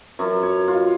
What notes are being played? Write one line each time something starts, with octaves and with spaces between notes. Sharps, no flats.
F#2
C#5
F4